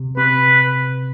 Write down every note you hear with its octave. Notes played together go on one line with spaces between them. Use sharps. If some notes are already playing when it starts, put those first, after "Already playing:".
Already playing: C3
C3 B4